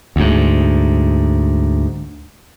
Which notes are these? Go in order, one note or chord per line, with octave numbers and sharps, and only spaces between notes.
D2 G#2